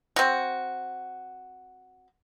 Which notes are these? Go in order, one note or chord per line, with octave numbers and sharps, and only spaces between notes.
C4 F#4